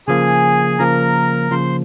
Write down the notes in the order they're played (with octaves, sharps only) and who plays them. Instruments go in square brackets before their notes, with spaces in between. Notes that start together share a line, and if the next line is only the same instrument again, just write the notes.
[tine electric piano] C#3 F3 A#3 [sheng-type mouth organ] G#4 G#5
[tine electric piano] C#3 F3 A#3 [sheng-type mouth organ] A#4 A#5
[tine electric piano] C#3 F3 A#3 [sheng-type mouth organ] C5 C6